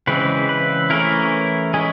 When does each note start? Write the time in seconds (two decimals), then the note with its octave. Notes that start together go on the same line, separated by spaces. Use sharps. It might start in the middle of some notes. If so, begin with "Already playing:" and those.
0.07 C#3 E3 G#3 C4 B4
0.49 B4
0.90 E3 A3 C#4 E4 A#4
1.74 G#3 C#4 E4 G#4